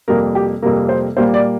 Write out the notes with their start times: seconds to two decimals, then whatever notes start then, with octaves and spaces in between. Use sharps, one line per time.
0.08 F2 C3 G3 A#3 A#4
0.35 G4
0.62 F2 C3 G3 A#3 A#4
0.89 C5
1.17 A#2 G3 A#3 C5
1.34 D5